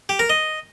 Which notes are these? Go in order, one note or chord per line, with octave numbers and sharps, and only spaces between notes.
G4
A#4
D#5